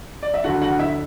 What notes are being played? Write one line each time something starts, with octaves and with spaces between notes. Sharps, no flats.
D5
E5
D2 D3 A3 D4 F#4 F#5
F#4 F#5
E4 E5